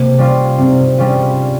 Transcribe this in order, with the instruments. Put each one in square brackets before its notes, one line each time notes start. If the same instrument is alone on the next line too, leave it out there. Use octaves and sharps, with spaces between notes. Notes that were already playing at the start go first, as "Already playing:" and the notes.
Already playing: [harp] C3 [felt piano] A#3
[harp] G3 C#4 F4
[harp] C3 [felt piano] C4
[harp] G3 C#4 F4